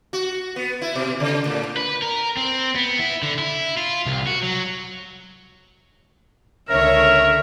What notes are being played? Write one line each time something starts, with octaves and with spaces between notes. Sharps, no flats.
F#4
B3
E4
B2
C#3
A2
B4
A#4
C4
B3
E4
D3
E4
F4
C2
F#4
F#3
C#2 D3 A#4 C#5 E5